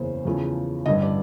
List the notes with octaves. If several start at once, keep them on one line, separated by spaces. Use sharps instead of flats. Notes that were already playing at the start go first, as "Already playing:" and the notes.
Already playing: F#1 E2 C#3 C5
E2 C#3 F3 A3
A1 G2 D3 D#5
D5